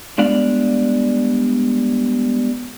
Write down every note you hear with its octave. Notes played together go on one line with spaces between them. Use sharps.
G3 G#3 B3 D4 D5 F5